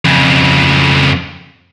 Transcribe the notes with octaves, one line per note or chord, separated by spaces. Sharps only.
F2 C#3